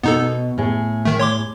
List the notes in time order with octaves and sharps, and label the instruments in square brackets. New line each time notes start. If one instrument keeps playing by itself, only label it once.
[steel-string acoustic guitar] B2 [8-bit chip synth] B3 D#4 A4
[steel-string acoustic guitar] A2 G#4
[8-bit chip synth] D#3 A3
C#5 C6 D6